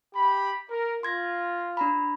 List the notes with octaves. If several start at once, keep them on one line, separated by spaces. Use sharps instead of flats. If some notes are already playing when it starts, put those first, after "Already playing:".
G4 B5
A#4
F4 C6 G#6 A#6
D4 A#5 B5